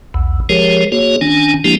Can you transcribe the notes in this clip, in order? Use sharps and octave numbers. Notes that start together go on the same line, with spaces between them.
B1 E2
F3 G#3 G4 G#4 A#4 C#5
A#3 F#4 G#4 C#5
D#3 C#4 D4 G#5
F3 G#3 A#3 D4 E4 G4